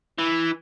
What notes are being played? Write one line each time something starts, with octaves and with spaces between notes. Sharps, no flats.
E3